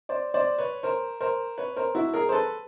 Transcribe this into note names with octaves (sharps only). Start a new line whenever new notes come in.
C5 D5
C5 D5
B4 C#5
A#4 C5
A#4 C5
B4 C#5
A#4 C5
E4 F#4
G#4 A#4
C5
A4 B4